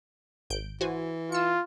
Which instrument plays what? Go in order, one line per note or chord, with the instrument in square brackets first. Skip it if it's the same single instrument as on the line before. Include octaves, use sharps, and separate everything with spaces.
[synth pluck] G#1 G6 D7
[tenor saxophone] E3 [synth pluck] F#4 C5 G#5
[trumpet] F4 [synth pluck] E6 C#7